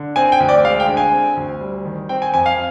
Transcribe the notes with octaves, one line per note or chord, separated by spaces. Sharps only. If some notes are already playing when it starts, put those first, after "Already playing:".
Already playing: D3
C4 G#5
G5
D2
D5
G#3 F5
G5
D3
G#5
C4
D2
G3
D#3
C4 G5
G#5
F2 G#5
F5